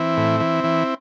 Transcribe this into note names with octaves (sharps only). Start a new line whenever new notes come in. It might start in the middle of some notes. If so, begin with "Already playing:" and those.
Already playing: E3 C4 E4
A2
E3
E3